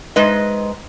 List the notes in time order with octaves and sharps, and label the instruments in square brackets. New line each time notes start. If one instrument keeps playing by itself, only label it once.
[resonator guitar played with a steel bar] G#2 G#3 B4 D#5